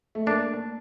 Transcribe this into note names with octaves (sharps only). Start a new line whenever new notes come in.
A3
A#3 D4